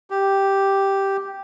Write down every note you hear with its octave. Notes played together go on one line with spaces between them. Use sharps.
G4